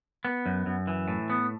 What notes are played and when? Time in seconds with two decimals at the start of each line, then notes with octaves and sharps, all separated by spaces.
0.25 B3
0.46 F#2
0.66 F#2
0.87 E3
1.08 A2
1.30 B3